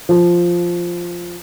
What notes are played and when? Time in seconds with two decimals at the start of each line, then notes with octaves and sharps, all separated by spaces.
0.09 F3